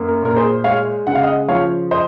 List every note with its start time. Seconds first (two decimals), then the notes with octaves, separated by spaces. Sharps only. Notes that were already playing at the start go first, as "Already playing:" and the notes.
Already playing: F#2 A#3
0.08 A#4
0.22 A#2 A#4
0.36 G#4 C5
0.64 G#3 C#5 F5
1.07 C#3 F#5
1.15 F5
1.23 D#5 F#5
1.48 F3 C#5 F5
1.91 C5 D#5